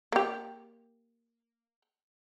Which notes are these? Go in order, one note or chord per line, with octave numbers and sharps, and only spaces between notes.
A#3 G4